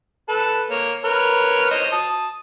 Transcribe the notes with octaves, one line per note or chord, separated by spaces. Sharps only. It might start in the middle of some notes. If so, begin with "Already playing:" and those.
A4 B4 A5
A#3 C#5
A#4 B4 C#5
C5 C#5 D#5
A5 D#6